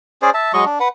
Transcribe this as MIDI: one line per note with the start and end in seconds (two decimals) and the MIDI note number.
0.22 0.30 61
0.22 0.30 68
0.22 0.30 72
0.22 0.30 74
0.34 0.52 76
0.34 0.52 81
0.53 0.65 54
0.53 0.65 56
0.53 0.65 75
0.53 0.65 85
0.66 0.79 62
0.80 0.88 71
0.80 0.88 78